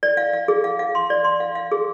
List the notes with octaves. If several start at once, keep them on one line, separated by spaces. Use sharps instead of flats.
D5
F5
F5
G#4
F5
F5
C6
D5
C6
F5
F5
G#4